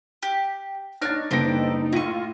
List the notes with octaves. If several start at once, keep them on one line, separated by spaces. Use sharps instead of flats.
G4
D4 D#4 C#5 F6 A6 A#6
F#1 G2 B3 G4 A4 C5 A#6 D7
A2 E4 F4 C#6 A#6 D#7